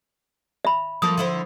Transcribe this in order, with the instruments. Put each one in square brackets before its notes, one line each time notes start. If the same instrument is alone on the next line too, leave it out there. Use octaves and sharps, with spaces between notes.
[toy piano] E5 B5
[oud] F3 A#3 A4 [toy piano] D#6
[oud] D3 E4 C5